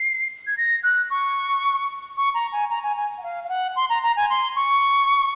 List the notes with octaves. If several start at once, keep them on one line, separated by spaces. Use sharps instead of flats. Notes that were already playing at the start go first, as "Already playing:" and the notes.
Already playing: C7
G#6
A#6
F#6
C#6
C#6
A#5
G#5
A#5
G#5
G#5
F#5
F5
F5
F#5
C6
A#5
A#5
G#5
C6
C#6